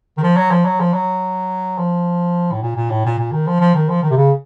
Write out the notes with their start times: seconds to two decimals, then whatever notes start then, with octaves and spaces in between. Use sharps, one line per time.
0.17 D#3
0.23 F3
0.37 F#3
0.51 F3
0.65 F#3
0.80 F3
0.94 F#3
1.78 F3
2.52 A2
2.62 A#2
2.76 A#2
2.90 A2
3.05 A#2
3.18 A#2
3.32 D#3
3.47 F3
3.60 F3
3.75 D#3
3.89 F3
4.02 D#3
4.10 C3
4.17 C#3